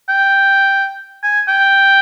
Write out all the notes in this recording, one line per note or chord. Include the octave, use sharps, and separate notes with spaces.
G5
G#5
G5